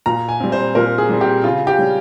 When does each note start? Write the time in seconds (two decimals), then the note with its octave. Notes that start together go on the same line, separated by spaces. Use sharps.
0.06 A#2 A#5
0.29 G#5
0.40 G3 C4
0.52 C5
0.75 A#2 A#4
0.98 G#4
1.09 G3 C4
1.21 G4
1.44 C#3 F4
1.67 G4
1.79 G3 C#4